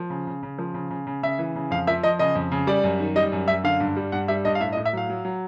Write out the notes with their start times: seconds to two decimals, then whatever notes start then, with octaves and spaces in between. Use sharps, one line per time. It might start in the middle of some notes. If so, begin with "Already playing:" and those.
Already playing: F3
0.10 C#3
0.27 C#3
0.43 C#3
0.59 F3
0.74 C#3
0.90 C#3
1.07 C#3
1.23 C#3 E5
1.39 E3
1.55 C#3
1.71 F2 F5
1.87 F3 E5
2.03 F3 D#5
2.19 C#3 D#5
2.35 F2
2.52 C#3
2.67 G3 D5
2.83 F#2
3.00 D#3
3.16 G3 D#5
3.32 F#2
3.48 F#2 E5
3.64 D3 F5
3.80 G2
3.96 G3
4.12 G2 F#5
4.28 G3 E5
4.45 G2 D#5
4.55 F5
4.61 A2 E5
4.72 D#5
4.77 A2
4.85 E5
4.93 F#3 F5
5.10 F#3
5.25 F#3